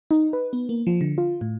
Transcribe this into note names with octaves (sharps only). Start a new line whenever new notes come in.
D#4
B4
B3
A#3
F3
D3
F4
A2